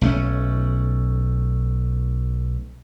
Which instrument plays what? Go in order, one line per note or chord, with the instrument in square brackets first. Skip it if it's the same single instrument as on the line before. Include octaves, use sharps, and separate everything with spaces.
[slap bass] B1 A3 C#4